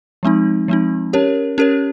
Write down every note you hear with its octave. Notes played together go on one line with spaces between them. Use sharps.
F3 G#3 C4 D#4
F3 G#3 C4 D#4
C#4 G4 A#4 C#5
C#4 G4 A#4 C#5